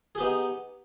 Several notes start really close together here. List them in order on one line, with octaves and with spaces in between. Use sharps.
G#4 G4 B3 D#4